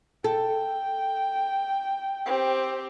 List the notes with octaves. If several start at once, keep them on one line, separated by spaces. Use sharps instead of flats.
A4 G5
C4 G4